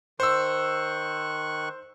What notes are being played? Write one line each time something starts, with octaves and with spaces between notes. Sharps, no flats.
D#3 C5 C#6 E6 F#6